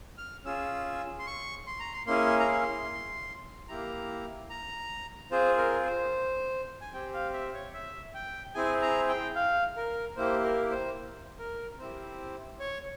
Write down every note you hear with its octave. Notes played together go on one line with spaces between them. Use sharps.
F6
C#4 F4 G#4 E6
C6
C#6
C6
A#5
C6
A#3 C#4 E4 G#4 C6
A#5
C6
A#3 E4 G4 A#5
A#5
C4 F4 G#4 C5
A#4
C5
G#5
C4 G4 G5
F5
E5
C#5
E5
G5
C4 E4 G#4 G#5
A#5
G5
F5
A#4
A#3 E4 G4 C5
A#4
C5
A#4
C4 E4 G4 C5
C#5